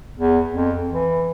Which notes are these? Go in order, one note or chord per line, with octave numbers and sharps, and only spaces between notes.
E2
F2
E3